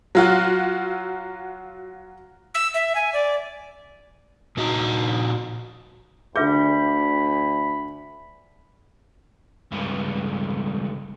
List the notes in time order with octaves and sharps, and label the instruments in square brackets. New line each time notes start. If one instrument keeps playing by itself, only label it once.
[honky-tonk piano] F#3 F4 F#4
[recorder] E6
E5
G#5
D5
[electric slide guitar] A#2 D#4 F#4 D#5 A#5
[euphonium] D2 [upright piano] D3 G6 [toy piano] G#4 B4 E5 [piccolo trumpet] B5
[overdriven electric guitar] C#2 G2